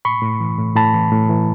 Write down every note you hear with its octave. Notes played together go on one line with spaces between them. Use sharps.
A2 B5 C#6
A2
E3
A2
A2 A5 B5
E3
A2
E3